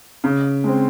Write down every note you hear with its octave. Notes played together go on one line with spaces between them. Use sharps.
C#3
G#3 C4